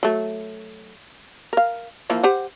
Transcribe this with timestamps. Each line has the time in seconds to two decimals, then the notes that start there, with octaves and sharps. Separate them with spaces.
0.03 F#3 A3
1.53 A#4 F5
2.10 E3 F3 A#3
2.23 G4 C5 F#5